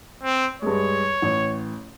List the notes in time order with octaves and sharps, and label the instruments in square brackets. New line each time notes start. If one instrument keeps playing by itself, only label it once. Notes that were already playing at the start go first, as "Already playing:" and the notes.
[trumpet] C4
[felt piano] G2 G#3 [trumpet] C#5
[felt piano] A1